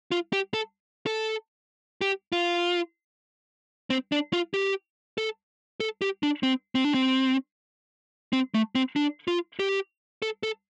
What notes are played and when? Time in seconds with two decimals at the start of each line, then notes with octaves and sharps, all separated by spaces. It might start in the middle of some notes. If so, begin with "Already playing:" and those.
0.12 F4
0.33 G4
0.54 A4
1.06 A4
2.01 G4
2.32 F4
3.90 C4
4.12 D4
4.33 F4
4.54 G4
5.18 A4
5.80 A4
6.02 G4
6.23 D4
6.43 C4
6.75 C4
6.84 D4
6.94 C4
8.33 C4
8.54 A3
8.75 C4
8.96 D4
9.28 F4
9.59 G4
10.22 A4
10.43 A4